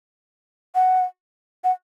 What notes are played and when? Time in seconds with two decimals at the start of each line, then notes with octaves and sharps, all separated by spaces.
0.75 F#5
1.64 F#5